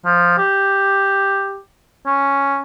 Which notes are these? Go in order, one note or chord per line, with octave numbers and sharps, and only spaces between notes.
F3
G4
C#4